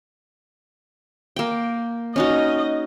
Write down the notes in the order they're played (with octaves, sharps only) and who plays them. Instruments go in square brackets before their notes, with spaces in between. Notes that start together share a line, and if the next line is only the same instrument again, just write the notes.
[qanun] A#3 G5
[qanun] C#4 D#4 F#4 [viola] D#5